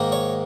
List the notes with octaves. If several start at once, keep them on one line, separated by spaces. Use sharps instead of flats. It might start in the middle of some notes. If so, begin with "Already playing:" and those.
Already playing: G#2 D#3 A#3
C#5